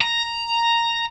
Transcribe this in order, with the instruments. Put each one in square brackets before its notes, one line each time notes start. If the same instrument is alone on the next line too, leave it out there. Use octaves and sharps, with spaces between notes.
[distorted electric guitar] A#5